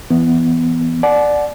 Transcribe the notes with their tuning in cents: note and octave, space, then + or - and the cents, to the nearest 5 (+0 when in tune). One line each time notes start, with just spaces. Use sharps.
E3 +15 B3 +0
D5 +5 F#5 +0 A5 -40